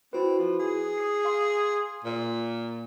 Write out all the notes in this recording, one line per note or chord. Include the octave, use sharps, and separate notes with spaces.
C4 E4 F#4 B4
F3
G#4
D#6 C7
F5 C6
A#2